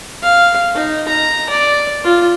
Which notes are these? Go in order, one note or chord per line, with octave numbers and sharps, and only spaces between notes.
F5
D#4
A#5
D5
F4